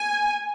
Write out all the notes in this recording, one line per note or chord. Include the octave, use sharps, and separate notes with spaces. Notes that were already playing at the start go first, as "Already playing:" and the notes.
Already playing: G#5